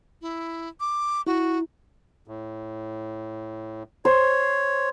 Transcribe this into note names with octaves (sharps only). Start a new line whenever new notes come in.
E4
D6
E4 F#4
A2
C5 C#5